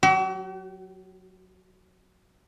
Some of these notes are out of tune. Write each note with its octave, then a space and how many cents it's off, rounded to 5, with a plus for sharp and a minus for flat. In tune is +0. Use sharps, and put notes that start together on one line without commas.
F#3 -5 F#4 +45